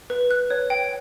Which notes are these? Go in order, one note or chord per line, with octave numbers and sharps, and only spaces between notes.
B4
F#6
C#5
G5